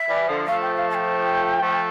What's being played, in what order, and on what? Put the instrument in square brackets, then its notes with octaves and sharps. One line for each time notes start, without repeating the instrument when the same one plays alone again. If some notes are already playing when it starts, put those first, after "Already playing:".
Already playing: [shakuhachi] E5
[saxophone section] E3 G3
D3 F3
[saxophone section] F3 A3 [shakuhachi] F5
[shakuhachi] G5
F5
A5
G5
[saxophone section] F3 A3